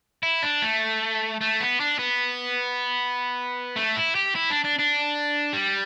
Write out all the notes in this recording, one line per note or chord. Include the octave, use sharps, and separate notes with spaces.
E4
D4
A3
A3
B3
D4
B3
A3
E4
G4
E4
D4
D4
D4
G3